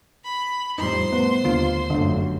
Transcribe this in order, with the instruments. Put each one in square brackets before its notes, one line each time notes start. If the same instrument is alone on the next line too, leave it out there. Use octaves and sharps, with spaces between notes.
[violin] B5
[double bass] F2 A2 [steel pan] G3 D#4 [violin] C5 C6
[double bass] A3 [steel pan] B3
[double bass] D#2 [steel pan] D3 A#3 F4
[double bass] G1 F#2 [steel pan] D3 A3